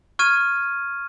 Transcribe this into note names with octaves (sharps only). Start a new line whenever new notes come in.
C#6 F6 G#6 D#7